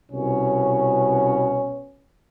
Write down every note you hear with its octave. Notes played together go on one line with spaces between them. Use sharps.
C2 B2 C#4